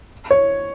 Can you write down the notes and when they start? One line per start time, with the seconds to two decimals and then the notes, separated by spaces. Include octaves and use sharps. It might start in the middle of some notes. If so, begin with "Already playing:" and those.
0.31 C#5